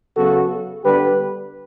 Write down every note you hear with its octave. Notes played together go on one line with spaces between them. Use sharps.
C#3 F#3 B3 F#4 A4
D3 G3 B3 G4 B4